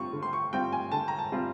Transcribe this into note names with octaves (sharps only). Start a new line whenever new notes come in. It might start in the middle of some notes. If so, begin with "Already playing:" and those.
Already playing: D3 G3 C4 F4 C#6
D3
C6
C#6
G3 C4 F4 G5
G#5
D3 A5
A#5
A5
G3 C4 F4